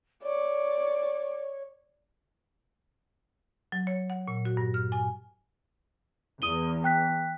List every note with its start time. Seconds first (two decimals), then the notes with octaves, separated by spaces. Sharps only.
0.23 C#5 D5
3.72 F#3
3.87 C#5
4.10 F#5
4.27 A#2
4.45 F#4
4.57 G2
4.74 F6
4.92 G#5
6.42 E2 D#6 D#7 G7
6.84 G5 F#6 B6